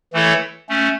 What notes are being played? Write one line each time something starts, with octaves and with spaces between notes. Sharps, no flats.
E3 A3 E4 A4 C#5
A3 C#4